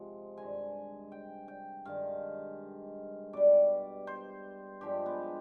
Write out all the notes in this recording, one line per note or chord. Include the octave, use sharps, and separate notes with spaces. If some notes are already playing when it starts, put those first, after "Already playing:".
Already playing: C3 F3 G#3
G2 D#3 G#3 G#5
G5
G5
G2 D#3 G#3 F5
B2 G3 D5
C5
G2 F3 G#3 G4
B3